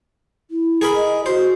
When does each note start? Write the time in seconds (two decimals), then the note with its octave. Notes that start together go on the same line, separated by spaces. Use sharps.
0.50 E4
0.81 G#4 A#4 B5
0.95 D#5
1.26 F#4 C5